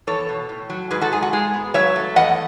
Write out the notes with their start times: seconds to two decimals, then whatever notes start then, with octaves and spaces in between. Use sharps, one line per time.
0.07 E2 A4 C#5
0.29 B2
0.49 A2
0.70 F#3
0.91 G#2 G#4 B4
1.01 F#4 A4
1.12 G#2 G#4
1.22 F#4
1.33 G#3 G#4
1.54 B3
1.74 F#3 C#5 E5
1.96 A3
2.16 E2 D#5 F#5